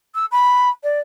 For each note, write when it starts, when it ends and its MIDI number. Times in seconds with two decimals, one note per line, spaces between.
0.15 0.25 88
0.32 0.69 83
0.83 1.00 74